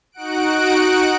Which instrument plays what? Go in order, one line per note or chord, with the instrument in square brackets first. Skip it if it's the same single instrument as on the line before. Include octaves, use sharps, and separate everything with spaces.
[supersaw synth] D#4 F#4 F#5 F#6 D7